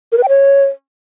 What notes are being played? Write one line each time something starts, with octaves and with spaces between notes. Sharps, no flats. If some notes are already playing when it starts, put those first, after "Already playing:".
A#4
B4
G5
C#5